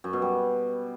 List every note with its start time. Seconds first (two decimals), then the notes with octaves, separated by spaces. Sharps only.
0.04 F#2
0.13 B2
0.22 G3